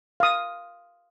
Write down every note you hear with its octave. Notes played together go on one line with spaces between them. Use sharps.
F5 D#6